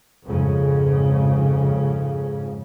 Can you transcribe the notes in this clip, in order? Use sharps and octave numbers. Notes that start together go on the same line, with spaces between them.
F2 G#2 C#3